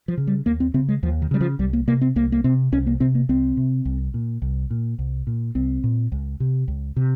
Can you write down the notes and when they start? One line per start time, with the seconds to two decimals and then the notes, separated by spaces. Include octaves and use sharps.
0.08 F3
0.17 C#3
0.27 G3
0.46 D#2 A#3
0.60 C4
0.74 C#3 C4
0.89 G#3
1.03 D#2 F3
1.22 D#3
1.31 C#3 G3
1.41 F3
1.59 C2 G3
1.73 A#3
1.87 C3 A#3
2.01 C4
2.16 C2 A#3
2.32 A#3
2.44 C3 C4
2.72 C2 C#4
2.87 A#3
3.00 C3 C4
3.15 A#3
3.29 C2 C4
3.57 C3
3.85 C2
4.14 A#2
4.42 C2
4.70 A#2
4.99 C2
5.27 A#2
5.55 C2 C4
5.84 A#2
6.12 C#2
6.40 C3
6.68 C#2
6.96 C3